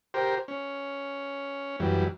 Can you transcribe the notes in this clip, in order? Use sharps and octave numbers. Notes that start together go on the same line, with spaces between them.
G4 A#4 C5
C#4
F#2 E3 G3